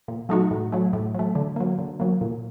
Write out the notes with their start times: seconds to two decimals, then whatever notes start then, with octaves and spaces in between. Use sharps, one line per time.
0.08 A#2
0.29 F#3 A3 D#4 F#4
0.51 A2
0.72 F#3 A3
0.93 A2
1.15 F#3 A3
1.35 D3
1.56 F#3 A#3
1.79 D3
2.00 F#3 A#3
2.21 A#2